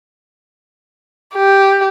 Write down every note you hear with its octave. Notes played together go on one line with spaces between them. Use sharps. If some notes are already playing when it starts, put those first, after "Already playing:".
G4